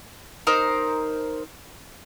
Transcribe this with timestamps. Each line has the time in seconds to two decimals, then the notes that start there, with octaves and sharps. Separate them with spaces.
0.47 D#4 A#4 C5